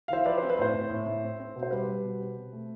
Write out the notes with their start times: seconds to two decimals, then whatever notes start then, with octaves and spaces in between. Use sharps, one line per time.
0.08 E3 C5 E5 F5
0.25 F3 B4 D5
0.38 C4 C5
0.50 B4
0.59 A2 C5
0.74 A2
0.90 A2
1.07 A2
1.23 C4
1.40 C4
1.56 B2
1.63 C5
1.71 G3 B4
1.88 G3
2.04 B2
2.21 C4
2.37 B2
2.53 A3